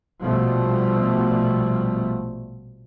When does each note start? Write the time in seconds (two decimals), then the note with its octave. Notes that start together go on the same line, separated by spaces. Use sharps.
0.23 A#1 B2 F3 G3 A3